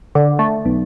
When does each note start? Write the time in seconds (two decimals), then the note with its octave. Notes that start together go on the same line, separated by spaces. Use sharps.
0.15 D3
0.39 A3
0.65 B1